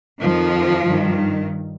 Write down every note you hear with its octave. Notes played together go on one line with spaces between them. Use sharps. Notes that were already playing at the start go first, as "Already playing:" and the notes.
F2 D#3 F3
G2 D#3